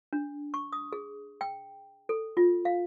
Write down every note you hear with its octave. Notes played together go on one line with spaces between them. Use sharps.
D4
C#6
D#6
G#4
G5
A4
F4
F5